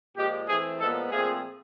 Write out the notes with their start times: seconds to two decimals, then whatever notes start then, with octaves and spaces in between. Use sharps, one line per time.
0.17 A#2 F3 G#3 G4
0.48 E3 A3 C4 G#4
0.80 A#2 F3 G#3 B3 A4
1.11 A#2 F3 A3 C4 G#4